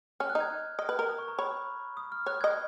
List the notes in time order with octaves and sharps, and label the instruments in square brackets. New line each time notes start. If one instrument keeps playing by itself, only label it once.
[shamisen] C#4 [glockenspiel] F6
[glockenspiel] F#6
[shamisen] D#4
[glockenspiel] G#6
[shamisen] D#5 [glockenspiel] F6
[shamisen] B4
A#4
[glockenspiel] D#6
C#6
A#5
[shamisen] C#5 [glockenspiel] B5
[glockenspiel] D#6
F6
[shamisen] C#5 [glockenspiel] F#6
[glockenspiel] G#6
[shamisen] D#5